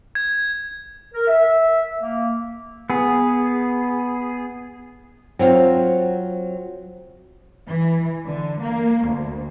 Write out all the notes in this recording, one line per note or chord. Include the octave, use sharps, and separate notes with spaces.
G#6
A#4
E5
A#3
B3 G#4
F#3 C4 F4
E3
D3
A#3
D2